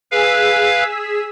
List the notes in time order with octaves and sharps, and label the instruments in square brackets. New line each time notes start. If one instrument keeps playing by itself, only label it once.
[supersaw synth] G#4 E6 B6 [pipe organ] B4 F5